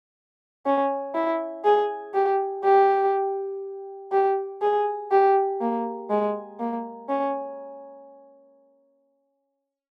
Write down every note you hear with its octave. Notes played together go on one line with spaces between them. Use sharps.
C#4
E4
G#4
G4
G4
G4
G#4
G4
A#3
G#3
A#3
C#4